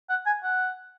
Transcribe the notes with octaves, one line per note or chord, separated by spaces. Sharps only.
F#5
G#5
F#5